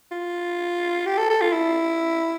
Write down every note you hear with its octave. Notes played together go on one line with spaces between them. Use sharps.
F4
G4
A4
A4
F4
E4